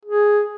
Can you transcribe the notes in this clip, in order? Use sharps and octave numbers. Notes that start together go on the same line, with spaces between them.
G#4